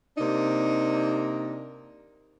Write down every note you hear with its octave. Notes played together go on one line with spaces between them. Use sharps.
C3 A#3 D4 D#4